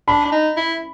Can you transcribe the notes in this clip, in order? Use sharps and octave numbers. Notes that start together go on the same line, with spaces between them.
D4 B5
D4
D#4
E4